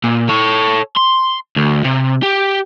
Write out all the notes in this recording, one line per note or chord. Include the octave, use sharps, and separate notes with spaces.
A#2
A4 C#5
C6
D2
C3
G4